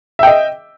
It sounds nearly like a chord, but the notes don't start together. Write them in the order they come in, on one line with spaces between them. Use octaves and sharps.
E5 G5 D#5